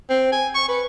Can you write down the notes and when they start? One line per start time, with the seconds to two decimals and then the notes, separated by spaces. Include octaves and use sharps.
0.10 C4
0.32 G#5
0.55 C#6
0.68 B4